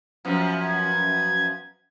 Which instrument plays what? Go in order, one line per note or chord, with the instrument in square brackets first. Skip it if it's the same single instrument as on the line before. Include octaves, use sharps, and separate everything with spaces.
[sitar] F#2 F3 B3
[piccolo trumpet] G#6